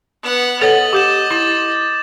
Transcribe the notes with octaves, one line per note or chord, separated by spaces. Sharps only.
B3 F#5
A4 C#5 D#5 F#5 A6 F#7
G4 D6 G6 E7
E4 D6 A6